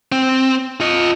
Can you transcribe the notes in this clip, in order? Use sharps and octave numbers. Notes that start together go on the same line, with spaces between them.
C4
F4 D#5